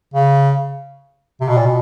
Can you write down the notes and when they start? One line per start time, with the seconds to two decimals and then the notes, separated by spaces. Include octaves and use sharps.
0.14 C#3
1.40 C3
1.48 B2
1.57 A#2
1.66 B2